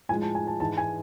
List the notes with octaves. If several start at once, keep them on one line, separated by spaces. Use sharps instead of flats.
A2 F3 G#3 G#5
A5
G#5
A5
G#2 E3 G#3 A5
G#5